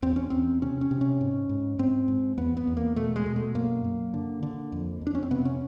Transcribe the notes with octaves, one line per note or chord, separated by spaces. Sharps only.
E2 C4
C#4
E2 C4
C3 C#4
C#4
C3
C#4
G#2
G#2
G#2 C4
G#2
E2 B3
B3
E2
A#3
B2 A3
G#3
B2
A3
F#2 A#3
F#2
D3
D3
F2
F2
D4
C#4
C4
C3 B3
C#4